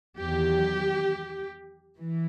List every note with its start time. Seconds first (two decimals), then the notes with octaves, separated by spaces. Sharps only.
0.18 E2 D#3 F#3 G4
1.98 E3